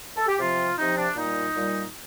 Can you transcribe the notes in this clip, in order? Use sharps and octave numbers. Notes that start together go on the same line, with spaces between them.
A4
G4
C3 F3 F4
C3 F3 D#4
D4
A#2 G3 D#4
A#2 G3